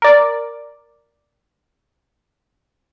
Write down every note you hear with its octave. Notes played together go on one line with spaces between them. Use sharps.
A#4 D5